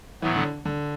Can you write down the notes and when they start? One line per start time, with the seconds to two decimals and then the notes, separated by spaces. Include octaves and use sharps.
0.22 A2 E3 F#3 B3
0.36 D3
0.65 D3